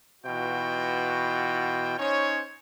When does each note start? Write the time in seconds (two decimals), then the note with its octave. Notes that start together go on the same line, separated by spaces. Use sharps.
0.24 B2 E3 F4 F#4 G5
1.98 C#4 D#4 C5 C#5